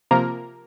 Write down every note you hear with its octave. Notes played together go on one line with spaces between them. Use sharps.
C3 F3 A#3 A#4 A#5